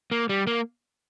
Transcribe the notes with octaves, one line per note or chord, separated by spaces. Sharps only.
A#3
G3
A#3